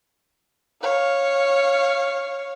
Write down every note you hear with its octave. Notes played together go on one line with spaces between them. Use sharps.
C#5 F5